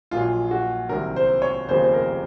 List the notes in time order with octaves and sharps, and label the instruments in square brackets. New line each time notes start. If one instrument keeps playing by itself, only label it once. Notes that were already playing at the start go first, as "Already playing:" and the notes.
[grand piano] A#1 A#2 F#3 F4
F#4
C2 C3 D#3 F#3 A#4
C5
C#5
F1 D#2 C#3 F3 C5
C5
A#4